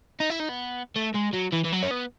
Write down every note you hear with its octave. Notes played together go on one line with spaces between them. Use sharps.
D#4
E4
D#4
B3
A3
G#3
F#3
E3
E3
F#3
C#4
B3